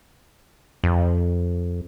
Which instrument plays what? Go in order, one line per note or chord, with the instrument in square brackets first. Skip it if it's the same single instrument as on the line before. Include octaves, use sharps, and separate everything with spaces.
[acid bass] F2